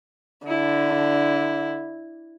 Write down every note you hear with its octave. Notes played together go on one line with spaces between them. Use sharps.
D3 E4